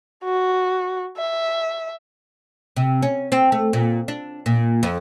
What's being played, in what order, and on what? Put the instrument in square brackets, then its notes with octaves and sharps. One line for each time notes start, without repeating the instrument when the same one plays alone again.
[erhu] F#4
E5
[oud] C3
C#4
C4
A3
A#2
D4
A#2
F2